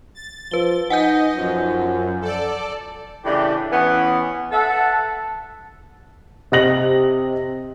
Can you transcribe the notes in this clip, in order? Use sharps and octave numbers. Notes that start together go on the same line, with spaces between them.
A6
F3 B4 G7
D#4 D#5 F#5 G#5 G6
F#2 F3
A4 D5
A2 C#3 E3 D4 G4
E3 B3 C#4
A4 E5 F#5
C3 D#5 A#6 F#7